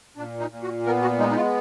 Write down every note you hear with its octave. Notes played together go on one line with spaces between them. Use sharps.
A#2 D4
D#4
A#2
F#4
B3 A#4
F#4
G#3 D#4
D#4
F4